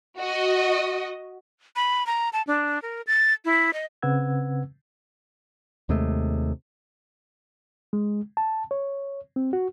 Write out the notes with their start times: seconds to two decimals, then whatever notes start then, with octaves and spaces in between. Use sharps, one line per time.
0.18 F#4 D#5
1.76 B5
2.07 A#5
2.33 A5
2.47 D4
2.82 A#4
3.07 A6
3.45 E4
3.73 D#5
4.02 C#3 C4 B4 F#5 E6 G#6
5.89 D#2 C3 G#3 A3
7.93 G#3
8.37 A5
8.71 C#5
9.36 C4
9.53 F#4